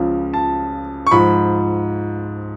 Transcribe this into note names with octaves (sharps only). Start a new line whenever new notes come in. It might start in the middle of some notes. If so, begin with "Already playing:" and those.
Already playing: C#2 C#3 F3
A5
C#6
G#2 F3 B5